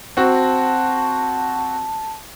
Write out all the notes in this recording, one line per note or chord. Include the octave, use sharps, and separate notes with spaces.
C4 F#4 A5